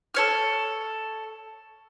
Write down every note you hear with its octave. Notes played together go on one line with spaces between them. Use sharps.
A4 C#5 F6